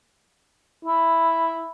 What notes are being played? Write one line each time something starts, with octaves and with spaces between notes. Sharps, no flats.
E4